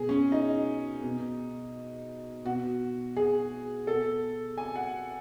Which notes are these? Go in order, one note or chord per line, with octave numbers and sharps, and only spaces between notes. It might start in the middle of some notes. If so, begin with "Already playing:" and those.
Already playing: B2 G#4
C#4
D#4
B2
B2 F#4
G#4
B2 A4
G#5
F#5